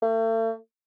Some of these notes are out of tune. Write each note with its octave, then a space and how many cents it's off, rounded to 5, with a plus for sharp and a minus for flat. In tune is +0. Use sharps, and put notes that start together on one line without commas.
A3 +40